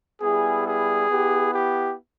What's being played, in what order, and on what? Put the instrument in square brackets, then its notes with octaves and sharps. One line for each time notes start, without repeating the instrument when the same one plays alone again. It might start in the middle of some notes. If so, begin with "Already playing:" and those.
[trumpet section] G3 B3 E4 G#4
G#4
B3 E4 G4
G4